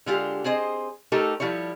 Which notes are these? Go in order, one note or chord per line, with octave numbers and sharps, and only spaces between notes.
D3 G#3 F4 G4
C4 G#4 C5 D#5
A3 D#4 G4 A4 A#4
F3 G3 E4 C#5